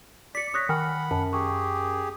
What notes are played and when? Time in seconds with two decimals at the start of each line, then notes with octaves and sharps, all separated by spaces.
0.35 D5 D6 B6 C#7
0.54 C#5 D#6 F#6 A#6
0.69 D#3 F#5 G#5 B5 F6
1.11 F#2 A5
1.33 G4 G#4 C#6